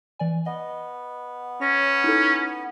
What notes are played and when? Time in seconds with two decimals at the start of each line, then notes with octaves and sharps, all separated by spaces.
0.19 E3 D5 G#5
0.46 B3 D#5
1.61 C#4 C#5 A#6
2.04 D#4 E4 A4